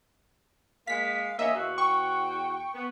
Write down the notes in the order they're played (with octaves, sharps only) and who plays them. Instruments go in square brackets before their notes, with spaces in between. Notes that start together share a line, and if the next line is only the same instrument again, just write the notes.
[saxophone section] G#3 A#3 [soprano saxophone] F5 [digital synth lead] B6
[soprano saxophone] A#3 [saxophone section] C#4 D#5 [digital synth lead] E5
[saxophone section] E2 F#4 [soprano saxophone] F5
[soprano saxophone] G5 [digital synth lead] C#6
[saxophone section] B3